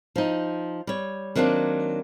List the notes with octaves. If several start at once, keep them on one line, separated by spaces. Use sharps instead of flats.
F3 D#4
G3 C#5
D#3 F#3 A#3 C4 D4